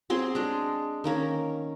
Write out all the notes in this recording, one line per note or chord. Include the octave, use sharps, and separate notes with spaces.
F#3 C4 G#4 C6
G#3 D4
D#3 A#3 C#4